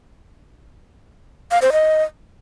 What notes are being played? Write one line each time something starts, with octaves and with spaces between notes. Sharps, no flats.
F5
C5
D#5